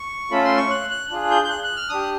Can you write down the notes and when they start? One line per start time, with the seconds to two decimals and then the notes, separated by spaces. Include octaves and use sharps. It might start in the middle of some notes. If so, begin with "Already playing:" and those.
Already playing: C#6
0.31 A3 C#4 F4 A4 B5
0.45 C6
0.57 C#6
0.71 F#6
0.90 F#6
1.10 D4 F4 G#4 F#6
1.31 G6
1.44 G6
1.50 F#6
1.64 F#6
1.77 F6
1.89 D4 G4 D#6